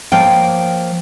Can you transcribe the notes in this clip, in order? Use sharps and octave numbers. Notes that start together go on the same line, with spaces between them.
F3 A#3 C#5 F5 G5